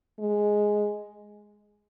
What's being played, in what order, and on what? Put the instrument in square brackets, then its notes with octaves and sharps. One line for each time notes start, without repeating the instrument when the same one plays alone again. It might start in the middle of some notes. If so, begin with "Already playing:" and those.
[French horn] G#3